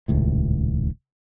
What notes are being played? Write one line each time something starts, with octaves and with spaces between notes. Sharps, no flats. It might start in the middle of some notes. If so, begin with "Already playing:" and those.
D#1 C#2 A2